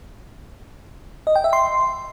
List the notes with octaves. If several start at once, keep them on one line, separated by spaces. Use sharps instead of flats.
D#5
G5
E5
C6